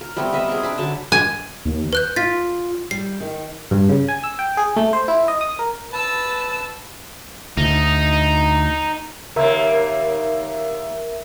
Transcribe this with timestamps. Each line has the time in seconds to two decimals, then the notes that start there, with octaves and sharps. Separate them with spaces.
0.01 A#4
0.17 G3 A3 B3 C4
0.33 B3 A#4 D#5 E5
0.48 C4 G#4
0.63 D4 D5 B5
0.78 D3 F#3 C#4 A5
1.12 G#5
1.65 D#2
1.93 B4 F#6 G6
2.16 F4 A6 B6
2.91 G3 C7
3.20 D#3
3.71 G2
3.89 C#3
4.08 G#5
4.24 E6
4.39 G5
4.57 G#4
4.76 A3
4.93 C5
5.08 E4
5.28 D#5
5.41 D#6
5.59 A#4
5.92 B4 A5 E6
7.57 D2 D#4
9.36 D#2 A#3 A#4 E5